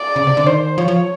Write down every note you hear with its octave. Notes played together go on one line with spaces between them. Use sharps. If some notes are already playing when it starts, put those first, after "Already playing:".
Already playing: D5
C#3
C3
D3
D#3 C5
F3 C#5
F3